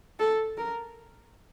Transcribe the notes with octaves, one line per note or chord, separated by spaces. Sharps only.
A4
A#4